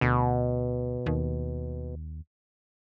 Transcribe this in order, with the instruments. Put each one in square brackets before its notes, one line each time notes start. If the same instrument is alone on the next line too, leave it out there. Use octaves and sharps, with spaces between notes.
[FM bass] D2 [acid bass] B2
[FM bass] D#2